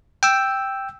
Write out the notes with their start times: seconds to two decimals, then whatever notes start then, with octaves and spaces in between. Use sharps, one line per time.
0.23 G5 E6